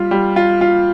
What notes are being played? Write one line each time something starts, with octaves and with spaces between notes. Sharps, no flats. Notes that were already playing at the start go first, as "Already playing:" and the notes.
Already playing: G3 F4
G3
F4
F4